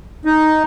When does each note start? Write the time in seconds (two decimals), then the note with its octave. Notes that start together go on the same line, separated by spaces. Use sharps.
0.25 D#4